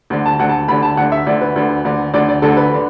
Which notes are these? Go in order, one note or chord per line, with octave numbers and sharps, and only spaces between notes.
D2 D3
A5
D2 D3 F#5
A5
D2 D3 B5
A5
D2 D3 F#5
E5
D2 D3 D5
B4
D2 D3
D2 D3
D2 D3 D5
D5
D2 D3 A4
B4
D3